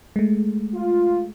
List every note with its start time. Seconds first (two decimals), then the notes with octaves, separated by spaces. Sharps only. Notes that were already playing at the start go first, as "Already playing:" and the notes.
0.16 G#3 A3
0.73 F4